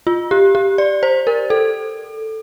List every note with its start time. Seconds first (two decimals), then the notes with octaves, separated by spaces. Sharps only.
0.07 F4
0.31 G4
0.55 G4
0.78 D5
1.03 C5
1.27 A#4
1.50 A4